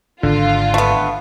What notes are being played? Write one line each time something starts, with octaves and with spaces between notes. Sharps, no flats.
G#1 D3 F4
A3 B3